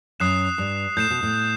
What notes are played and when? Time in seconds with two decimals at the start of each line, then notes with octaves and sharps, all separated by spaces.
0.20 F#2 D#6 F#6 C7 E7
0.58 G2
0.97 A2 G6 C7 E7
1.10 B2
1.23 A2